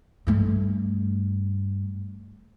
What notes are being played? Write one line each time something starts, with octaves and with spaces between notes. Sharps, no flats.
G2 A3